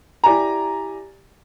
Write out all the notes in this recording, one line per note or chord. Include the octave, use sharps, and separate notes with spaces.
E4 G4 D5 G#5 A#5